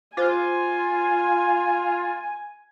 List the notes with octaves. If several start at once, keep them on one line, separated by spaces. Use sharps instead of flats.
F4 G#4 C5 G#5 D6